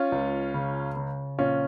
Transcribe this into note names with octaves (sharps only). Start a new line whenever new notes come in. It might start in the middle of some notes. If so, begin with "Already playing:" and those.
Already playing: C#4 F4
C#2
C#3
C#3
A#1 C#4 F4